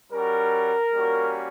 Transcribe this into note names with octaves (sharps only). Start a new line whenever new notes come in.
G3 C#4 F#4 A#4
G3 A#3 C#4 F#4